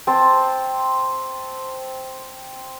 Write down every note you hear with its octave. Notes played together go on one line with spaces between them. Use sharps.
C4 A5